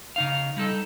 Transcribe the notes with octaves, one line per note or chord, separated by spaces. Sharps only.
C#3 D#4 F5
G3 D#4 A4